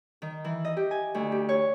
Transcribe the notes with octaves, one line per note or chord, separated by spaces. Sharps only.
D#3
E3
D#5
G4
G#5
D2
G4
C#5